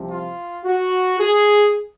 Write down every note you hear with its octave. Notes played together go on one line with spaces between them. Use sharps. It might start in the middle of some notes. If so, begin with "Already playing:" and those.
Already playing: C2 C3 F3
F4
F#4
G#4